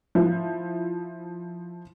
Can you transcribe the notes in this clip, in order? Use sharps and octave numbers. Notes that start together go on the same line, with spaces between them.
F3 E4